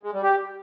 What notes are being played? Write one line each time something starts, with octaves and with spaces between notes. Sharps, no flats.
G#3
G3
G4